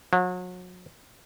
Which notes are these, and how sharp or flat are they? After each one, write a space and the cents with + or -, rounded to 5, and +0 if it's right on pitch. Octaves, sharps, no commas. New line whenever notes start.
F#3 -35